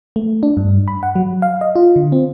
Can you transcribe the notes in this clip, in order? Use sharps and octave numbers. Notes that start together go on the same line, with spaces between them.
A3
D4
G2
B5
F#5
F#3
F5
D#5
F4
D3
C4